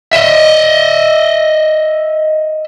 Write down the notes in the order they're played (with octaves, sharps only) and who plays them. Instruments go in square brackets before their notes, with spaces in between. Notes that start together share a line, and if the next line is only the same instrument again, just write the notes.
[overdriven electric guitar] D#5 E5